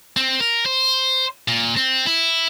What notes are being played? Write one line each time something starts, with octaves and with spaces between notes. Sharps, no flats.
C4
A#4
C5
A#2
C4
E4